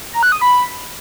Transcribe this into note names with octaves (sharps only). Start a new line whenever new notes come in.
A#5
F#6
D#6
B5